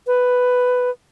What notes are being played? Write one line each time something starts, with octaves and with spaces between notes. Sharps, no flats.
B4